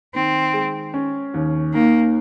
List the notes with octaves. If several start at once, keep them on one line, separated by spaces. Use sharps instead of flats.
D#3 C4
G#3
C#4
D#2
D#3 A#3